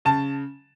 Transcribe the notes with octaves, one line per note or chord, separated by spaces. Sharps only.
C#3 A5